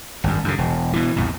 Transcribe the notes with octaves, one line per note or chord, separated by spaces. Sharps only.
G#1 F#2
F#2 C#3
E1
B2 E3
A#1 F2 A#2